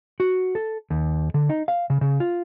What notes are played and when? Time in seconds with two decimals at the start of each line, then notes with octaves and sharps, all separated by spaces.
0.20 F#4
0.55 A4
0.90 D#2
1.34 D3
1.49 D#4
1.68 F5
1.90 C#3
2.01 C#3
2.20 F4